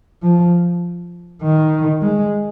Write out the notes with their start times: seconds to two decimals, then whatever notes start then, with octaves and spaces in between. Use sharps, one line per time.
0.22 F3
1.42 D#3
2.02 G#3